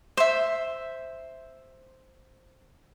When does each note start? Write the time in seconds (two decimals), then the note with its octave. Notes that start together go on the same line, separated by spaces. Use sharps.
0.17 C5 E5